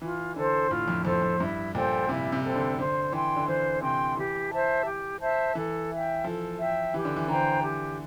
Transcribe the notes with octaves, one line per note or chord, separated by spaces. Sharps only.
E3 F4
D3 A4 C5
A2 F4
F2
F2 A4 C5
F2
G2 E4
A#2 A4 C5 G5
C3 E4
C3
A4 C5 G5
D3
D3 C5
E3 G5 C6
D3
E3 C5
C3 G5 C6
E3 G4
C5 E5 A5
G4
C5 E5 A5
E3 A4
E5 G5
F3 A4
E5 G5
E3 G4
D3
E3
D3 C5 G5 A#5
G4